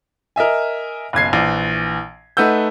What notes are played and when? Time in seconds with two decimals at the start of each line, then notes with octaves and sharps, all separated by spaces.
0.36 A#4 D#5 E5 G#5
1.13 F#1 B1 G#6 C7
1.33 A#1 E3
2.37 A3 D#4 B4 F#5 E6 G6